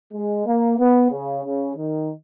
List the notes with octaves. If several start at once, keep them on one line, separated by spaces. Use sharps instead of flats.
G#3
A#3
B3
C#3
C#3
D#3